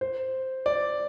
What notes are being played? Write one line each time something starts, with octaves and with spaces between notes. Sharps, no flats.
C5
D5